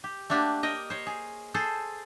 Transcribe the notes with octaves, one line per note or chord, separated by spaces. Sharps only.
G4
A3 A#3 D4 F#4 G4
A#4 D#5 G5
C5 C#5
G#4
G#4 A4 C5